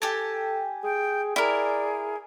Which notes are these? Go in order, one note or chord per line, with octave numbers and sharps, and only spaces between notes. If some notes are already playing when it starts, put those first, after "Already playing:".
G4 A4 G#5 A5
G#4 G5
E4 G#4 A#4 D5